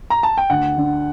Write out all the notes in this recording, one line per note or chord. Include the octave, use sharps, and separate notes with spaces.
A#5
A5
G5
D2 F#5
D3